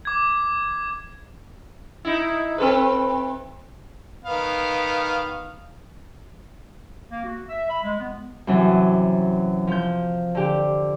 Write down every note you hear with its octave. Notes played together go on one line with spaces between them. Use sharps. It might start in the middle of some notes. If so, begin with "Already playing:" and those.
D6 G#6
D#4 E4
C4 A4 B4
D#3 B3 F5
A#3
F#4
E5
B5
G#3
B3
F#2 C3 E3 F#3
F3 G6
D3 G4